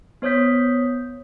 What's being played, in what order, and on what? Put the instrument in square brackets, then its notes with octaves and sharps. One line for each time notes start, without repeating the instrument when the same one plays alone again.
[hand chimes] B3 C5 C#5 D#6 G6 B6